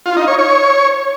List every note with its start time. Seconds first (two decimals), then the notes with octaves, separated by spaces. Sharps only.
0.06 F4
0.17 D#4
0.28 C#5
0.39 C#5